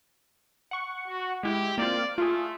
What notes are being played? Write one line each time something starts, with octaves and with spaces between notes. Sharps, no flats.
F#5 C#6
F#4
G#3 E4 G4
A#3 C4 F4 D5
A3 F4 G#4